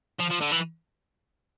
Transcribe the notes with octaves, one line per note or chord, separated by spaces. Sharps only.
F3
F3
D3
E3